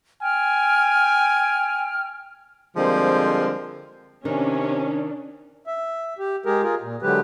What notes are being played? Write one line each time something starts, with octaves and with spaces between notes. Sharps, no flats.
G5 G#5 F6
D3 F3 G3 G#3 A#3 C4
C3 D#3 C#4 D4
E5
G4
G#3 G4 G#4 A#4
F4 G#4 A#4
A#2
D3 F#3 G#3 G4 B4